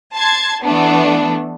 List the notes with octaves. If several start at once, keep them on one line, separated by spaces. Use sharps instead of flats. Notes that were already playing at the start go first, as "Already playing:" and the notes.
A5 C6 G#6
E3 A3 B3 D4